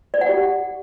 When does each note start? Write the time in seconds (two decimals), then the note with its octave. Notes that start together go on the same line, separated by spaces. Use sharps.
0.14 D5
0.21 F#5
0.29 G4